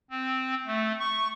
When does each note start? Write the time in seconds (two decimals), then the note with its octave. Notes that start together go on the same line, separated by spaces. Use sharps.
0.10 C4
0.66 A3
1.00 C#6